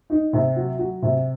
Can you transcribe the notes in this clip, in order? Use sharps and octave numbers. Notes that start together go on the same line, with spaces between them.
D#4
C3
F#3
F#3
C3